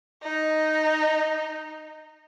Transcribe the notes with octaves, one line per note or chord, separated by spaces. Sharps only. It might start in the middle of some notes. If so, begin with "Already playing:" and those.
D#4